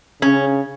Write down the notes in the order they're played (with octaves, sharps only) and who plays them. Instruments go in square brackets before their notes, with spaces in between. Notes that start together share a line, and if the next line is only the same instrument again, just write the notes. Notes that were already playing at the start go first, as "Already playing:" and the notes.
[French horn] C#3 [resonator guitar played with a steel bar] C#4